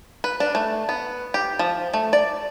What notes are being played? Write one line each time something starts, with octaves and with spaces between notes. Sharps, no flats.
B4
D4
A3
B3
G4
F3
A3
D5